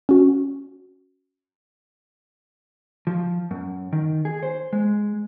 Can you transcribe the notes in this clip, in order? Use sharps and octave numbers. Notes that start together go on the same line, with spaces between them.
C#4 F#4
F3
F#2
D#3
G#4
C5
G#3